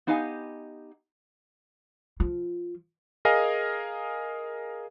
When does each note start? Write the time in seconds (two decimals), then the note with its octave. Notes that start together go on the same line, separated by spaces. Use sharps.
0.07 B3 D#4 G4 D#5 F5 G#5
2.20 F3 F4
3.25 G#4 A#4 D#5 F5 G#5